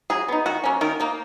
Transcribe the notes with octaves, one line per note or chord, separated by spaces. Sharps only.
F#3 G#4
B3 D#4
D#3 F#4
F#3 A#3 C#4
D#3 A#4
A#3 D#4